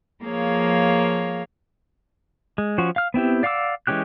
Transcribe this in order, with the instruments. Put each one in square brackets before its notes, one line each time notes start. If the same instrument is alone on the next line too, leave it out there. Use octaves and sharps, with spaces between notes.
[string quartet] F3 A#3 G#4 C#5 F5
[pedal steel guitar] G#3
F3 C#4 F#4
F5 F6
B3 C4 E4 G4
D5 F5 F#5 D6 E6
E3 G#3 C#4 G4 F#6